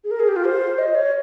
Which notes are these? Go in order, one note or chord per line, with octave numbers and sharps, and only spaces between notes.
G#4
A#4
G#4
G4
F4
C5
D#5
C#5